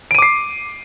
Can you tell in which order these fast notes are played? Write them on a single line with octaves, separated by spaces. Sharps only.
D7 D#7 D6 C7